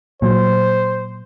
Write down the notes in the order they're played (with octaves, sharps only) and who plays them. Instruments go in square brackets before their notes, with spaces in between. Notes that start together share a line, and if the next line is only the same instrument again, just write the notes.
[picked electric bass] A#2 F#3 [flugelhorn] C5